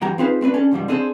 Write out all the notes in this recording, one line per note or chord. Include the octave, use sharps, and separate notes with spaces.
G2 E3 F#3 G5 A#5
C4 D#4 F4 G#4 B4 C5
A3 C4 D4 B4
C#4 D4 A4
C#2 G#2 F3 G3
C4 D4 G#4 A4 B4 C5